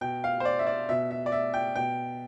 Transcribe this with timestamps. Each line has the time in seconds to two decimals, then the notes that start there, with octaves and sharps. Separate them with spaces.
0.01 B2 G5
0.24 F5
0.40 C5
0.45 D5
0.59 E5
0.67 D5
0.89 B2 E5
1.11 E5
1.26 D5
1.32 E5
1.54 G5
1.76 B2 G5